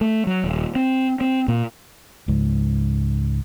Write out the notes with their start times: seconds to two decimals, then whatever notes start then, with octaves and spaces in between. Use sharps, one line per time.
0.01 A3
0.27 F#3
0.44 D#1
0.75 C4
1.21 C4
1.48 A#2
2.28 C#2 G#2